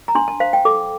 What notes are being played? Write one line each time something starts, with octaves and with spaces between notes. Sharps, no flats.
A#5
D4 C6
A5
C5 F5
G5
A4 D6